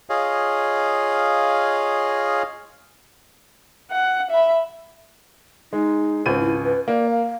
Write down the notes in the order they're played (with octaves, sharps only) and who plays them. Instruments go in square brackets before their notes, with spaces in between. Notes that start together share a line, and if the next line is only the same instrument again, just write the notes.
[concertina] F4 G#4 C#5 D#5 F5
[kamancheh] F#5
E5 B5
[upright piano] G#3 [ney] D#4
[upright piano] G#1 C#2 D#7 [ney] C5
[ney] E4
B4
[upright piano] A#3 [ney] D5
[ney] F5